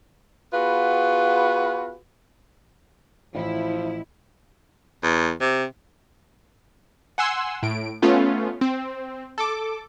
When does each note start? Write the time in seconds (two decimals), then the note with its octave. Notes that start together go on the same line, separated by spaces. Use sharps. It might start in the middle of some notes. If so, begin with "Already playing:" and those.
0.54 B3 F4 F#4 G#4 B4
3.35 A1 F3 E4
5.03 E2
5.41 C3
7.18 F#5 G#5 C6 E6
7.63 A2 D7
8.02 A3 B3 C#4 F4
8.61 C4
9.38 A4 D6